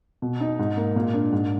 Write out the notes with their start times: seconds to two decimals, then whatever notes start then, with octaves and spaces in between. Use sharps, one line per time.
0.22 B2
0.40 D#4
0.59 G#2
0.77 A#3
0.96 A#2
1.14 D4
1.32 G#2